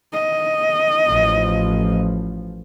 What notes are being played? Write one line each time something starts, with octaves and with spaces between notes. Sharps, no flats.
D#5
A1 F3